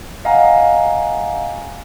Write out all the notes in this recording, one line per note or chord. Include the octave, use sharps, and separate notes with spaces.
D#5 F5 F#5 G#5 A#5